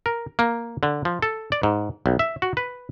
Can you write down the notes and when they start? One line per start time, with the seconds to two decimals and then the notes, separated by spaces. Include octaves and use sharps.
0.06 A#4
0.39 A#3
0.83 D3
1.05 F3
1.22 A4
1.52 D5
1.63 G#2
2.06 B1
2.19 E5
2.42 F#4
2.57 B4